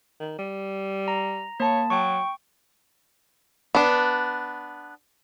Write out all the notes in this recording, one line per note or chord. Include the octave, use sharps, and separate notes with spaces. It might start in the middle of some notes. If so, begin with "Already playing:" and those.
D#3
G3
A#5
A#3 C#5 A5
F#3 G5 C#6
B3 D4